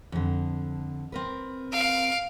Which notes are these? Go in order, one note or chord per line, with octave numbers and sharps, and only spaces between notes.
F2 D3
C4 A#4 B4
F5 D7